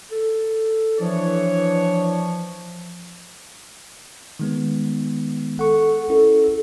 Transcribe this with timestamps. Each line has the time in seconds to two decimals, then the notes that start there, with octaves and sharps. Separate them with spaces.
0.11 A4
1.00 E3 F3 D4 C#5
4.40 D#3 G#3 B3
5.59 A4 F#5 C#6
6.10 C#4 E4 A4 A#4